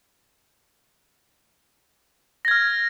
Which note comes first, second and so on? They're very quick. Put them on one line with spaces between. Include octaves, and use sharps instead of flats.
A#6 G#6 F6